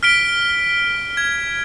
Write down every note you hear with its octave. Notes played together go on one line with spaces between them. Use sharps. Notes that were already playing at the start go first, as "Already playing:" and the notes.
F6 B6 D7 G7
G#6